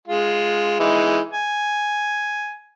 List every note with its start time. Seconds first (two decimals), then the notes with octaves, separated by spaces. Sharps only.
0.08 G#3 F4
0.80 E3 G#3 D#4
1.33 G#5